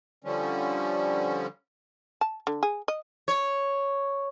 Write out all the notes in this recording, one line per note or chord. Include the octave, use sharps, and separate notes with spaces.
D3 F3 G3 C#4
A5
D3
G#4
D#5
C#5